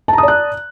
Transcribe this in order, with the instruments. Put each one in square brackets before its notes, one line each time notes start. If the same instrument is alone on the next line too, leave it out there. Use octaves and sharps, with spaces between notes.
[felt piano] A5
A#5
D#6
D5
F#6